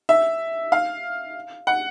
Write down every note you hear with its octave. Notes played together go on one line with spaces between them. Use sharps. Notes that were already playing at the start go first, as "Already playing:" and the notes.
E5
F5
F#5